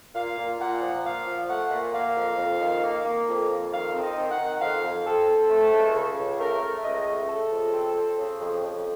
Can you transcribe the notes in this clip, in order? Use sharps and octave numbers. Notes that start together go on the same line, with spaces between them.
A#2 F5
A#2
A#2 F#5
F3
A#2 F5
F3
A3 F#5
A#2
A#3 F5
F2
F2
D#3
A#3
A#3
F2
F2
D#3 F5
C4
D#5
D#3
F#5
D#3
F2 F5
F2
C4 A4
C4
A3
C#2
C#3
C#2
A3 A#4
A3
C#2 D#5
A3
C#3 A4
F2
C4
C4
C#3
F2
F2